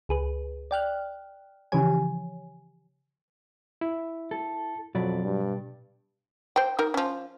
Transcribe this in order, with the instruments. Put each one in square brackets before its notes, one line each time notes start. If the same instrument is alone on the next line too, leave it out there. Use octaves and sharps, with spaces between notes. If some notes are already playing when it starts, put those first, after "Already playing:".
[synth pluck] C#2 G#4 B4
D5 G5 F6 F#6
C#3 E3 F3 G4 C#5 G#5
[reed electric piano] E4
[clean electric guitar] A4
[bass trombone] F2 [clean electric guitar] B2 D5 B5 [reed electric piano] F#3
[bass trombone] G2
[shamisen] C5 G5
D#4 A#4
F3 C#4